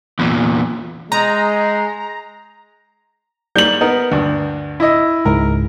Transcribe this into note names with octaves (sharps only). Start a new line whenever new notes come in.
E2 A#2
G#3 D#4 A#5
G#2 G3 A#3 G6 F#7
B3 D#4 A#4
D2 G2
E4 D#5
C#2 G#2 A#4